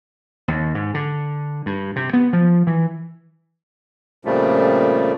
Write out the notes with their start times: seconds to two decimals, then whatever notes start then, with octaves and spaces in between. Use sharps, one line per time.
0.48 D#2
0.74 G#2
0.94 D3
1.66 G2
1.96 C3
2.13 B3
2.33 F3
2.67 E3
4.25 F2 A#2 C#3 F3 G3 A3